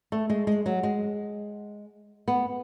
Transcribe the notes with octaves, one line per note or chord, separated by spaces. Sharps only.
A3
G#3
G#3
F#3
G#3
B3